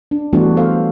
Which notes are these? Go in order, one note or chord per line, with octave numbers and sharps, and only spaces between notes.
D4
E3 G3 A3 B3 D4 F#4
F#3 B3 A4 C5 F5